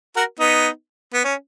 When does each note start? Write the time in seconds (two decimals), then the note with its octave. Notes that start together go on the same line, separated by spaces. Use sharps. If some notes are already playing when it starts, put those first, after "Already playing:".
0.16 F#4 A#4
0.39 B3 D#4
1.14 B3
1.24 C#4